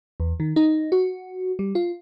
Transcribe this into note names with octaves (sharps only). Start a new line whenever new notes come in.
E2
D#3
D#4
F#4
G3
F4